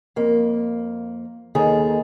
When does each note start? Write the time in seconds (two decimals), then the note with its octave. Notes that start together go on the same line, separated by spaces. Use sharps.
0.16 F2 A#3
1.55 D#2 D#3 G#4 A4 A#5